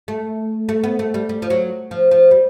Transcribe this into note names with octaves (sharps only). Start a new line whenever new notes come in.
A3
A3
B3
A3
G3
G3
F3
F#3
F3
F3
G3